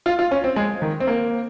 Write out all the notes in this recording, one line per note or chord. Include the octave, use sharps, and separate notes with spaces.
F4
F4
C#4
C4
G#3
D#3
C4
A#3